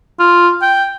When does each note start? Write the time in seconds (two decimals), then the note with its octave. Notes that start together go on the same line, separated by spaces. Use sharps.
0.19 F4
0.62 G5